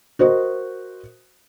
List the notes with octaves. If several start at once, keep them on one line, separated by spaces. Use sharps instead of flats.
F#4 A#4 C5 D#5